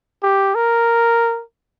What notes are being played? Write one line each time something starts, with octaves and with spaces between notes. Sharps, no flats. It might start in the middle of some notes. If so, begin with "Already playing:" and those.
G4
A#4